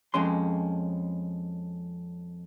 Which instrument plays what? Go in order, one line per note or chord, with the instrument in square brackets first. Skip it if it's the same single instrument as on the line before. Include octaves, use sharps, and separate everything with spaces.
[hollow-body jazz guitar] F2 G#3 C#4 C6